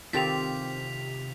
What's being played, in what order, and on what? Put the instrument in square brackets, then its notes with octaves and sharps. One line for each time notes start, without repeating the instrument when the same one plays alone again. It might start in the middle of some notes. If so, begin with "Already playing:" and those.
[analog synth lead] C3 [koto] D#3 C4 A4 [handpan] F4 G4 [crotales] B6 F7